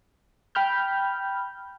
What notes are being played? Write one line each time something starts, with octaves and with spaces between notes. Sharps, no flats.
G5 B5 F6 G6